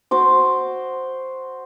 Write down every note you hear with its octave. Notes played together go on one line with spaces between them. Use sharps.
F#4 C5 D6